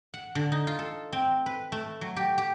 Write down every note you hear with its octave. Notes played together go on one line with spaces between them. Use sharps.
F#5
D3
D#4
F4
A4
C4
B4
A3
F#3
G4
G4